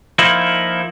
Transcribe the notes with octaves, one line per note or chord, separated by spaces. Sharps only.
F3 A#3 D#4 E4